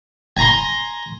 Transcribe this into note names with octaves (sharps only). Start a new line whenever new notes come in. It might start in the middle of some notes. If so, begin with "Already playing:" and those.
G#5 A#5 C6